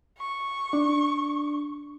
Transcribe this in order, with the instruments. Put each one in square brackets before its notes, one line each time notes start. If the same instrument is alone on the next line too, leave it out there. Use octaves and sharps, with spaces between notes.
[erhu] C#6
[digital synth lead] D4